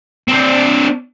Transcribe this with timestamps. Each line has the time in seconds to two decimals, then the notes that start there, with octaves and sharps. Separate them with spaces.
0.28 C4 D4